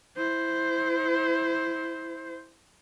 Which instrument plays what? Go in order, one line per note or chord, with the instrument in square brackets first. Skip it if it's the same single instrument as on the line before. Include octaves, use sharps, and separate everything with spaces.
[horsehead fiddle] E4 C5